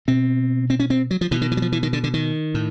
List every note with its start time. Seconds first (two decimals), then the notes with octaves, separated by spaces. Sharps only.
0.08 B2 C4
0.70 C4
0.80 C#4
0.90 C4
1.11 F#3
1.21 F3
1.31 B2 E3
1.42 D#3
1.52 E3
1.57 F#3
1.62 F3
1.72 E3
1.83 D#3
1.93 D3
2.04 D3
2.14 D#3
2.54 A2